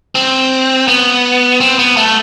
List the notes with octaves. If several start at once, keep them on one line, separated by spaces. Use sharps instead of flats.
C4
B3
C4
B3
A3